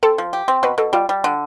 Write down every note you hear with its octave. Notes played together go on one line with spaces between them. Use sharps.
C4 A4
F3
G4
C4
B2 B4
B2 A4
G3 F4
G3
D3